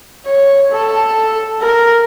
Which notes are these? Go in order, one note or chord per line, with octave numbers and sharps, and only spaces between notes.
C#5
A4
A#4